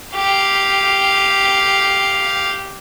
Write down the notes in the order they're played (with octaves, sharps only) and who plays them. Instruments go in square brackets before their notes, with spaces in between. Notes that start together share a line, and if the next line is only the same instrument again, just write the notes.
[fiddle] G4 F5